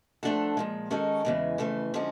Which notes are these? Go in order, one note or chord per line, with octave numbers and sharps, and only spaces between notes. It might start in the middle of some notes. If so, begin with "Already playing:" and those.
F3 A3 D4 F#4 A4
A#2 F3 G#3
D#3 G#3 C#4 F#4 A4
E2 C#3 E3 G#3
F2 C#3 E3 A3
D3 F3 G#3 C#4